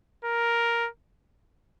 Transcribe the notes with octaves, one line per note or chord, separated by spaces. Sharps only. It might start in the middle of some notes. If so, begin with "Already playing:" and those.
A#4